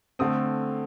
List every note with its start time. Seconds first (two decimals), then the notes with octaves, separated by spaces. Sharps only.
0.19 D3 A3 C4 D#6